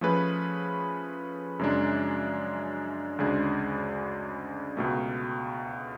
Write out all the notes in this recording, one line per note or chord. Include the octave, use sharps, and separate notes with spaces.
F3 A3 C#4 G#4 B4
F#2 C#3 G#3 D4
D2 C#3 G#3 D4 G#4
C#2 B2 A3